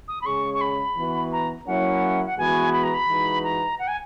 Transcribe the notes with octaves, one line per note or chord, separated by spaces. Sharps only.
D#6
B5
C#3 G#3 C#4 G#4 C#6
C#6
B5
E3 B3 F#4 B4
A#5
F#3 A#3 C#4 E4 F#5
F#5
E3 G#3 B3 F#4 B4 G#5
B5
A#5
B5
E3 G#3 D#4 F#4 B4
A#5
F#5
G#5